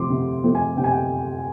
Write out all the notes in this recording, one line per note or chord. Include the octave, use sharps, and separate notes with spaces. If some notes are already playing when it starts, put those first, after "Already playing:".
Already playing: C3 F3 A3 C4 C6 D6
C3
F3 A3 C4
G#5
C3 G5
G#5
G5